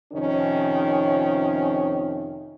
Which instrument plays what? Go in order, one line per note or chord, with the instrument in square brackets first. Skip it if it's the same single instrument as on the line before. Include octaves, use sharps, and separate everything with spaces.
[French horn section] F2 C3 D#3 C#4